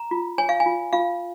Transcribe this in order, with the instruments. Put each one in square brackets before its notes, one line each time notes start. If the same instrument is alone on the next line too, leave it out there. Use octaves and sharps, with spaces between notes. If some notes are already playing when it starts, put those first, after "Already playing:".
Already playing: [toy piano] A#5
F4
C#5 G#5
F5
G#5
F4
F4 F5